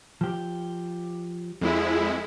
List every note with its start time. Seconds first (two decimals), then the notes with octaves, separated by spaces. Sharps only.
0.21 F3 G4
1.61 F2 G#3 E4